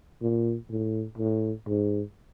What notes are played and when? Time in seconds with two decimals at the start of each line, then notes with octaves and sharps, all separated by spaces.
0.22 A#2
0.70 A2
1.18 A2
1.67 G#2